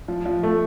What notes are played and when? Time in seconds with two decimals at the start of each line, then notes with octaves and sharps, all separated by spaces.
0.08 F3
0.26 F3
0.43 A3